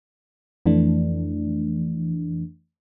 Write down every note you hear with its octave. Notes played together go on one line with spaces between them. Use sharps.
F2 E3 A3 D4